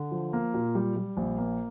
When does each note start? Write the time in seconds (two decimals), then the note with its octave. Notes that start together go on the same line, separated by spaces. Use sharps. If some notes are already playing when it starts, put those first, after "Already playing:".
Already playing: D3
0.11 F3
0.33 A#3
0.54 A#2
0.75 G3
0.96 G3
1.17 A#1
1.38 A#3